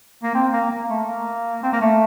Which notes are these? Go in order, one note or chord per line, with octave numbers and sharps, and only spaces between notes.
A#3
C4
A#3
A#3
A3
A#3
C4
A#3
A3